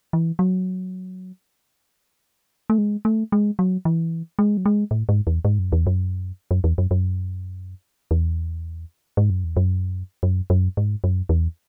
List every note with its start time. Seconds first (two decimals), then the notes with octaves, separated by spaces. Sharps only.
0.13 E3
0.39 F#3
2.70 A3
2.78 G#3
3.05 A3
3.32 G#3
3.59 F#3
3.85 E3
4.39 G#3
4.57 F#3
4.66 G#3
4.91 A2
5.09 G#2
5.27 E2
5.45 G#2
5.59 F#2
5.72 E2
5.87 F#2
6.51 F#2
6.64 E2
6.78 F#2
6.91 F#2
8.11 E2
9.17 G#2
9.30 F#2
9.44 E2
9.57 F#2
10.23 F#2
10.50 F#2
10.77 G#2
11.04 F#2
11.29 E2